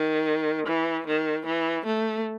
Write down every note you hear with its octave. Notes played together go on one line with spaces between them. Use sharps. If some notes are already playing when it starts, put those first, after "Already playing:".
Already playing: D#3
E3
D#3
E3
A3